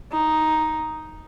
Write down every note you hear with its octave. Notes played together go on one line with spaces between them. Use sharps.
D#4